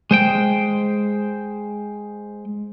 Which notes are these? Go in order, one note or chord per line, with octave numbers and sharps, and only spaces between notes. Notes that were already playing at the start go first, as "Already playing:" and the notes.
G#3 C5 G5